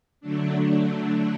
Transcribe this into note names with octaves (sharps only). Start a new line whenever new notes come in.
D3 F#3 A3 D4